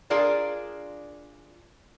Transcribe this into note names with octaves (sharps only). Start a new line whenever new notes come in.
D4 F4 G#4 A#4 D5